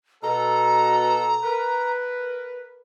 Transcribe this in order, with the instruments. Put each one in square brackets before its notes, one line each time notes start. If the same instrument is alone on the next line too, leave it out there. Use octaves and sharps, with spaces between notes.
[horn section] B2 A4 [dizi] A#5
[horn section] A#4 B4